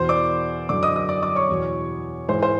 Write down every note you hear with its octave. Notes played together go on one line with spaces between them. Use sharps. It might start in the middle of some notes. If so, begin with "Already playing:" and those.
Already playing: E2 B2 C5 C6
D5 D6
F#2 D3 D5 D6
D#5 D#6
D#5 D#6
D5 D6
D5 D6
C#5 C#6
E2 B2
G#2 E3 C5 C6
C5 C6